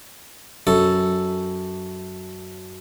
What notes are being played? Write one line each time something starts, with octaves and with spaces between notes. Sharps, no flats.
F#2 A4